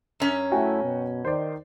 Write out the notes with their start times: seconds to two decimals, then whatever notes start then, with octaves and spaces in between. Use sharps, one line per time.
0.20 F#2 C#4
0.52 A3 E4 F#4 G5 G#5
0.83 B2
1.25 D#3 C5 D5